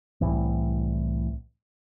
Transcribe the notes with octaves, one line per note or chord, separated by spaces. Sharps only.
C2 A2 E3